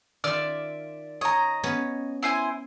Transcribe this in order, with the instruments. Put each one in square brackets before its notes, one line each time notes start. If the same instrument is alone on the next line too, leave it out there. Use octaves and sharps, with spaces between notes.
[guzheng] D#3 F4 [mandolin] D5 E5 F6
[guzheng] C#5 [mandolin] D#5 A#5
[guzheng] B3 C#4 C#5
[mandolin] E4 C5 G#5